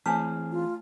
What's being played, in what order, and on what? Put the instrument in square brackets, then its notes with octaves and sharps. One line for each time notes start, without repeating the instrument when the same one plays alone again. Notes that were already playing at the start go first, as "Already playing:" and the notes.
[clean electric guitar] E3 C4 G#4 [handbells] A3 F6 [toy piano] C#5 G#5 A5
[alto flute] F4